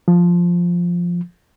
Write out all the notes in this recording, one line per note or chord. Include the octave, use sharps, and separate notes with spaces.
F3